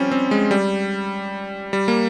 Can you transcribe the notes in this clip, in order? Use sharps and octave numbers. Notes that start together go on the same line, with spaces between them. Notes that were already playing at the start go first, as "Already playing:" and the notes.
Already playing: F3 G3 C4 C#4
C4
G#3
G3
G3
A#3